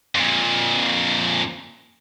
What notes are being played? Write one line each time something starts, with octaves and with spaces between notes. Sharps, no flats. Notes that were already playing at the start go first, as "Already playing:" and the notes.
F2 A#2